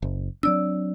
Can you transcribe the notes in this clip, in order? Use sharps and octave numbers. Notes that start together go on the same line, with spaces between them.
F#1
F#3 C4 D4 D5 E6